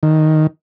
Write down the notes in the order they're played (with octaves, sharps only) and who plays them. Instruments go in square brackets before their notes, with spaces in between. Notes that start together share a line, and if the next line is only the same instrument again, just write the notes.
[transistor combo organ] D#3